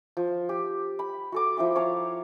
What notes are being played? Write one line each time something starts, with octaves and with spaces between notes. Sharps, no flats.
F3
G4
B5
F#4 A4 D6
F3 E4 G5 D6
C#5 F5 A5 A#5